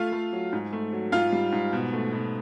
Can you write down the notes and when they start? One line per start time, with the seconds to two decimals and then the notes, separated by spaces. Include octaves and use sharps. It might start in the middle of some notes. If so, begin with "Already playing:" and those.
Already playing: A3 F4 F5
0.13 A3
0.33 F#3
0.53 G#2
0.73 A3
0.93 F#3
1.12 G#2 F4 F5
1.32 G3
1.52 G#2
1.73 B2
1.93 A3
2.13 B2